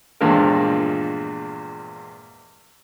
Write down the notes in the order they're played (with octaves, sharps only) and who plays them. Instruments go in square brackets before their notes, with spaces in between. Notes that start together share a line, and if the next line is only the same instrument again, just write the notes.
[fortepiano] E2 G2 A#2 F3 G#3 A#4